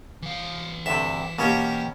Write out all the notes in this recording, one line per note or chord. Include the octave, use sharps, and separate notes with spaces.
E3 F5
D2 G2 C3 E5
B2 A#3 C#4 G4